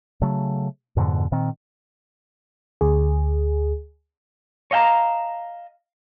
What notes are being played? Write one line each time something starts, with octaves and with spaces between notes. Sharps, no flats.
C#3 F#3 A3
F2 G#2 B2 D3
A#2 D#3 C4
D2 G#4
C#5 D#5 F5 G5 A5 A#5